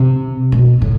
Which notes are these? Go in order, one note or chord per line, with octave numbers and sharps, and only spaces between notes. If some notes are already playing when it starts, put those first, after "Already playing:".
Already playing: C3
B2
A2